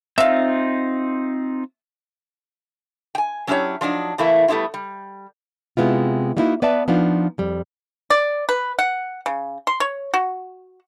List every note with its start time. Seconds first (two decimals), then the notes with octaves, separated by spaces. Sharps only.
0.18 C4 D#4 F4 E5 F5
3.15 G5 G#5
3.47 F#3 C#4 D4 E4 G4 C#5
3.81 F3 F#3 D4 D#4
4.18 E2 E3 A3 A#3 E4
4.48 G3 A3 B3 E4 F4
4.74 G3
5.77 C3 G#3 B3 E4 F4
6.37 G3 A#3 B3 D#4 E4 F#4
6.62 B3 B4 D5 E5 A5
6.88 F3 B3 D4 D#4 F4
7.38 F2 G3
8.10 D5
8.49 B4
8.79 F#5
9.26 C#3
9.67 C6
9.80 C#5
10.14 F#4